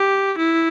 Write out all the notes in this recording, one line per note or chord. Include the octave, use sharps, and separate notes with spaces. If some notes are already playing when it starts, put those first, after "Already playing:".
Already playing: G4
E4